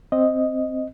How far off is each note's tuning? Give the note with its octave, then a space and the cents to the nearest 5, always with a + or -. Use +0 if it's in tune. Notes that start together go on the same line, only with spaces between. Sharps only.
C4 +0 D#5 +0